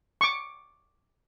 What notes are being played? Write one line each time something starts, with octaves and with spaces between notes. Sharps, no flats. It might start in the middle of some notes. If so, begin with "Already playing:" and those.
C#6 D6